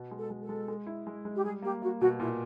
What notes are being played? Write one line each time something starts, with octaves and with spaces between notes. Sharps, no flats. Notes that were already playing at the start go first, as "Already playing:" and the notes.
Already playing: B2
G#3
A4
G#3
A4
G#3
G#3
E4
G#3
G#3
G4
G3 G#4
A#3 G4
A#3 F#4
B2 F#4
A#2 E4